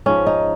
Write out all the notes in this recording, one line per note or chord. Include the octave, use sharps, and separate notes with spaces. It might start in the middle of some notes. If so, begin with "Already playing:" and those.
G#2 F3 C#4
D#4